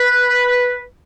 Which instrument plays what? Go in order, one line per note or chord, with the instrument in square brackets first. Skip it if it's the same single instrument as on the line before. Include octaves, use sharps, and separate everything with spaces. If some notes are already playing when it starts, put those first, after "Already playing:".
Already playing: [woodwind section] B4